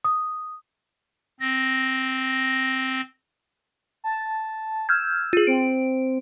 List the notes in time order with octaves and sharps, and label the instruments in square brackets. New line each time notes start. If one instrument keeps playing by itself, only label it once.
[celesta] D#6
[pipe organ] C4 A#6
[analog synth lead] A5
[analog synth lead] E6 [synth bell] F6 G6 G#6
[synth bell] F4 G#4
[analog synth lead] C4 [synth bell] D7